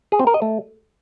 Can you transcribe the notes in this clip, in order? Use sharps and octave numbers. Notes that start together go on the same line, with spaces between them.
G#4
C4
A#4
D#5
A3